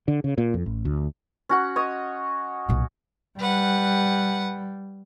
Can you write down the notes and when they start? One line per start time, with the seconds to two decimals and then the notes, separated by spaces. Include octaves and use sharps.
0.08 D3
0.24 C#3
0.38 A#2
0.54 F2
0.66 A1
0.85 D2
1.49 C#4 F#4 F#5
1.76 C#5 D#5 D#6
2.69 B1 A#2
3.39 G3 B4 F#5